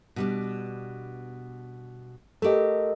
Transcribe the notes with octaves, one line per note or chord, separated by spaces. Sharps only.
B2 G3 D4
A3 G4 A4 A#4 D#5